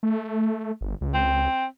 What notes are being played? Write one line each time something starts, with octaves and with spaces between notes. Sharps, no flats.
A3
G1
C#2
C4